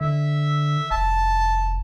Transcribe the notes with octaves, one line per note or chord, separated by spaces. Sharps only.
D3 E5
F1 A5